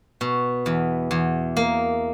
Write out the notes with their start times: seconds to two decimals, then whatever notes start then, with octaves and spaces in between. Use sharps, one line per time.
0.21 B2
0.66 E2
1.11 E2
1.57 A#3